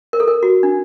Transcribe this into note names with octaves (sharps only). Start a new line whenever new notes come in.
A#4
A4
A#4
F#4
D4